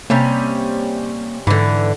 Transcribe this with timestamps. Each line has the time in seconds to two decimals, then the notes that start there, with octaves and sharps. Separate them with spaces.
0.10 C3 G3 A#3 C#4
1.47 G#2 D3 E3